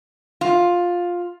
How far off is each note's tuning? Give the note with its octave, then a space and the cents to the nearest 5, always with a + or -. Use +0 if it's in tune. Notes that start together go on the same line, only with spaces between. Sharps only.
F4 +10